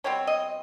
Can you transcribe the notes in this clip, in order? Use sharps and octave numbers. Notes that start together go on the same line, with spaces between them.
B2 G3 C4 C#5
D#5